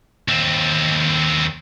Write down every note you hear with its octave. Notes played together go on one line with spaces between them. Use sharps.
D#2 C4